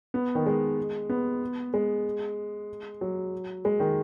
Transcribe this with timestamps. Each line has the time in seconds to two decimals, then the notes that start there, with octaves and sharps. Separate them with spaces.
0.14 B3
0.35 D#3
0.46 G#3
1.09 B3
1.74 G#3
3.01 F#3
3.65 G#3
3.80 D#3